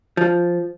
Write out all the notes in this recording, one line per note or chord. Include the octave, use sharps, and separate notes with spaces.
F3